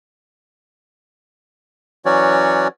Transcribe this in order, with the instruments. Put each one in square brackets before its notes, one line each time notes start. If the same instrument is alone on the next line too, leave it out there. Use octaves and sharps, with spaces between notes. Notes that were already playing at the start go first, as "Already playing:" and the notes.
[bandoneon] E3 F#3 C#4 F#4 C#5 D5